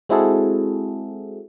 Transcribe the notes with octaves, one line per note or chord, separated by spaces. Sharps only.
G#3 C4 E4 F#4 G#4 A4